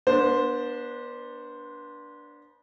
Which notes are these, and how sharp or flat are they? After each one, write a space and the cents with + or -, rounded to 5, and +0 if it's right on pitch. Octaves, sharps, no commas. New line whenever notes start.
B3 -35 D4 +0 C5 +0